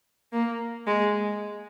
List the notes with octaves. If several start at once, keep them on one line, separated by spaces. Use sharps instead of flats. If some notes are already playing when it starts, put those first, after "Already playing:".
A#3
G#3